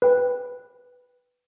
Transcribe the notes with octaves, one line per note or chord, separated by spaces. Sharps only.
B4 G5